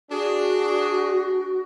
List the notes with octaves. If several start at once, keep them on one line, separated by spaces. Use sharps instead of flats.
D4 F#4 G#4